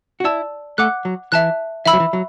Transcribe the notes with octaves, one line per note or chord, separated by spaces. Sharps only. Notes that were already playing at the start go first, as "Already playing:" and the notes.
F#4
E4 D5 A5 E6
A3 F#5 D6 F#6
F#3
E3 E5 A5 F#6
E3 E5 B5 E6
F#3
E3
F#3